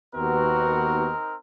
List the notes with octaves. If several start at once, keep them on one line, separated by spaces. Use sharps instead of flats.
D#2 B3 C4 D#4 F#4 A#4